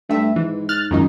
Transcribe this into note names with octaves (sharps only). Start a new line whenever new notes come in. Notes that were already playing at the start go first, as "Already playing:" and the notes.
G2 A3 E5
G#2 E3
F6 F#6 A6
C#2 F#2 D#3 D#4